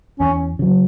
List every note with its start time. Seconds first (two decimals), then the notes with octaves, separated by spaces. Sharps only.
0.20 E2 C#4
0.59 C#3 F#3